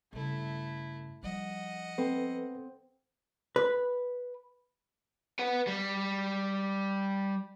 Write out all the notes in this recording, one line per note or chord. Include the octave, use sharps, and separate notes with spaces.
G2 C#3 A3 E4
F3 G3 D#5 F#5
C4 A4 B4
B4
B4 F#5
G3